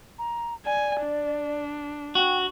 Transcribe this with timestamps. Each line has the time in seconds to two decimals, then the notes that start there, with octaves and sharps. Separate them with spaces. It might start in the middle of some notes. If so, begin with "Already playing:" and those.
0.19 A#5
0.65 D5 G#5
1.03 D4
2.15 F#4 G5